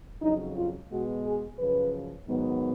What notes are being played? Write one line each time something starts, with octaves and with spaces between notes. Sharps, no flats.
F2 C#3 F#3 D#4
F4
B2 G#3 B3 F#4
G#4
F#2 C#3 F3 B4
G#2 D#3 F#3 B3